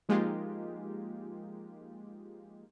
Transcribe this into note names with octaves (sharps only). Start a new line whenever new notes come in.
F3 G#3 A#3 D#4 F4 G4